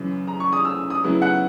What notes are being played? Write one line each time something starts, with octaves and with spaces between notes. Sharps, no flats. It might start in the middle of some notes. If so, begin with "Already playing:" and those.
Already playing: F#2 C#3 E3
A#5
C#6
D#6
E6
D#6
C#3 F#3 B3 E4
F#5